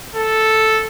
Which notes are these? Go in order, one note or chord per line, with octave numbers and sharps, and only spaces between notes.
A4